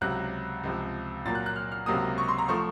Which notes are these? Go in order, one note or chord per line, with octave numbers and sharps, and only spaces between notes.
C#2 C3 F#3 F#6
C#2 C3 F3
A#2 F#3 A#3 A6
F#6
F#6
F6
F6
C#2 C3 F#3 A#3 D#6
C#6
C6
A#5
F3 A3 C#6